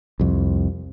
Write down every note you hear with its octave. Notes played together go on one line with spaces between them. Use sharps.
C2 F2